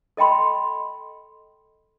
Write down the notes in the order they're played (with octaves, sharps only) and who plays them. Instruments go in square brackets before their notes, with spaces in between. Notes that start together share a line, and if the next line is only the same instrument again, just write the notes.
[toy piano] A4 D#5 G5 B5 C6